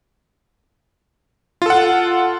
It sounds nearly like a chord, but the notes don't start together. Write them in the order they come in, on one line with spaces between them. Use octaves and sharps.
F4 A4 F#5